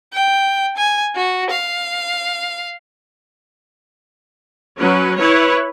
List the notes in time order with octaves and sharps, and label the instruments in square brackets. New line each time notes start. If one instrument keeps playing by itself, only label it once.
[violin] G5
G#5
F#4
F5
[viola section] F#3 C#4 B4
E4 B4 C#5